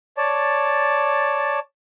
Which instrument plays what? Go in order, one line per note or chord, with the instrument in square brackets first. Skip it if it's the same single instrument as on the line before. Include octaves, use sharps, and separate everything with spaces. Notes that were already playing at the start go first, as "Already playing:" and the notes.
[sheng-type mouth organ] C#5 D5 A5